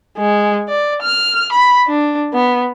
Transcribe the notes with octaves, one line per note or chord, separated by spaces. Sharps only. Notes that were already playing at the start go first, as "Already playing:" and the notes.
G#3
D5
F6
B5
D4
B3